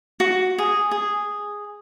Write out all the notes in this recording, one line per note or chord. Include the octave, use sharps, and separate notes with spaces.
F#4
G#4
G#4